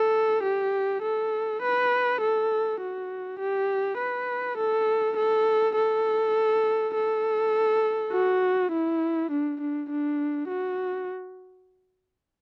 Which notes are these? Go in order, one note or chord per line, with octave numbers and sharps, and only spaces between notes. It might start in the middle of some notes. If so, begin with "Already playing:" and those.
Already playing: A4
G4
A4
B4
A4
F#4
G4
B4
A4
A4
A4
A4
F#4
E4
D4
D4
D4
F#4